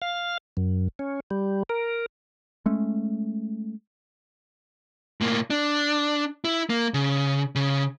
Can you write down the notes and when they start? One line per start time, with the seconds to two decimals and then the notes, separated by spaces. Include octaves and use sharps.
0.02 F5
0.57 F#2
0.99 C#4
1.31 G3
1.69 A#4
2.66 G#3 A3 C#4
5.21 A2 A#3
5.50 D4
6.45 E4
6.70 A#3
6.94 C#3
7.55 C#3